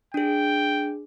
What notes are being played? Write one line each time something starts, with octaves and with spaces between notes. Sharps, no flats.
D4 G#4 G5